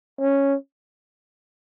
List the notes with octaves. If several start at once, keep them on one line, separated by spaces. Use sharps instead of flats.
C#4